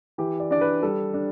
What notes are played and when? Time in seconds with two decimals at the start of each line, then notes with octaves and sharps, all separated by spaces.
0.18 E3 G4
0.40 D5
0.51 D4 D5
0.61 B4
0.82 G3 A4
1.14 D4